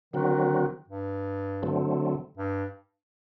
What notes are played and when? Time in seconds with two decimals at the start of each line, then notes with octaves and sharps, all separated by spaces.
0.14 D3 D#3 F#3 C4 F#4
0.88 G2
1.63 D3 F#3 A3 C4
2.37 G2